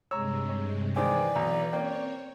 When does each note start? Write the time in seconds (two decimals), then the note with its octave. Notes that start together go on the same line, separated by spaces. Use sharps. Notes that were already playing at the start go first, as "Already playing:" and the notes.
0.11 G2 C3 G#3 C#5 A#5 E6
0.49 C#5
0.96 D#3 E3 G#3 C4 B4 D5 G#5 D6
1.36 B1 A#5
1.73 A#3 C4 C#4 C#5 G5